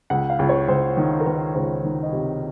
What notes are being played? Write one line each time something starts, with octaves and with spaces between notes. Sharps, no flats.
C#2 F#5
F5
C#2
C#5
C#2 C5
D#3
A#4
D#3 B4
C#2 C5
D#3
D#5
C3